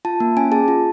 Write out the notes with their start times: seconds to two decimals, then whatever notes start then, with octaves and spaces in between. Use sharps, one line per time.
0.05 F4 A5
0.20 A#3
0.37 C#4 G#5
0.52 G#4 A5
0.68 F4